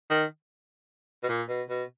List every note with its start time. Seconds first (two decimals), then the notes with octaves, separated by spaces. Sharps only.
0.10 D#3
1.23 B2
1.29 A#2
1.48 B2
1.69 B2